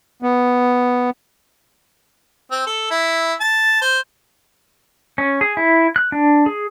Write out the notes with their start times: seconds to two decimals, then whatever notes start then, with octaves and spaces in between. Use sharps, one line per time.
0.22 B3
2.51 C4
2.67 A4
2.90 E4
3.40 A5
3.81 C5
5.18 C#4
5.41 G#4
5.57 E4
5.96 F#6
6.12 D4
6.46 G#4